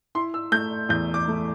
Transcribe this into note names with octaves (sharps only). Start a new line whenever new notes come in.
E4 C6
E6
A3 G6
E2 G6
D6
A3